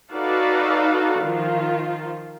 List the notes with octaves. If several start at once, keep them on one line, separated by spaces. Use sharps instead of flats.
D#4 F#4 A4 B4 D5 F5
D#3 F3 F4